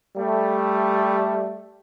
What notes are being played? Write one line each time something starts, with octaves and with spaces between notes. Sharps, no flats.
G3 A3